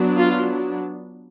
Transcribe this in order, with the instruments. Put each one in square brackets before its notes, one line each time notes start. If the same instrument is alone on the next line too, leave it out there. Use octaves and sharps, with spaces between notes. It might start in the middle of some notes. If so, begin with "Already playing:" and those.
Already playing: [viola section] F#3 B3 D4
F4